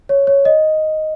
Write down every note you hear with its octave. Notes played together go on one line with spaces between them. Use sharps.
C#5
C#5
D#5